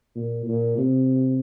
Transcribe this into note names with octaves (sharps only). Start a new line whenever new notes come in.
A#2
A#2
C3